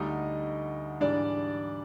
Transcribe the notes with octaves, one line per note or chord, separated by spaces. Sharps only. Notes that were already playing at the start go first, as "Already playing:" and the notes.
Already playing: D2 D3 G3 D#4 D#5
G#2 E3 G3 D4 D5